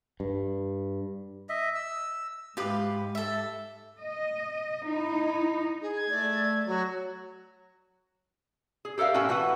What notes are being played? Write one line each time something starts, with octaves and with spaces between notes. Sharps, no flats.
G2
D#5 E5
E6
G#2 F4 G4 B4 D6
A4 E5
D#5
D#4 E4
G#4
G#6
A3 D5
F#3 F#4
G#4
G4 A4 A#4 E5 F5
A2 C#4 F#4 G5 A5
E3 F#4 B4 F#5